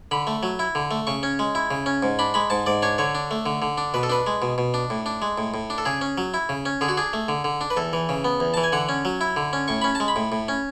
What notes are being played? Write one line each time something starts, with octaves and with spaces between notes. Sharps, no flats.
D3 B5
A3
F#3
E4
D3
A3
C#3 C#6
C#4
G#3
E4
C#3
C#4
G#2
D4 B5
G#3 B5
G#2 A5
G#2 D5
D4 C#5
D3 C#5
D4
A3
D3
D3
D4
B2 B4
A4
D4 B4
G#3
B2
B2
D4
A2
D4
G#3
A2
A2
D4
A4
C#3 G#4
C#4
F#3
E4
C#3
C#4
D3 G#4
F#4
D4 G#4
A3
D3
D3
D4
B4
E2 A4
E3
C#3
B3
E2
E3 A5
G#5
D3 F#5
C#4
F#3
E4
D3
C#4
A2 C#6
C#4 B5
A5
G#3
B5
A2
A2
C#4